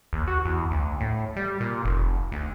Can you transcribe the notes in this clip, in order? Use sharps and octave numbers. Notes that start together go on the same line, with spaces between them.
D#2
F#4
E2
D2
A2
G3
A#2
F1
D2